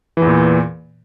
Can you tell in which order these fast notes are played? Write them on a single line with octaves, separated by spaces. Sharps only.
E3 E2 A#2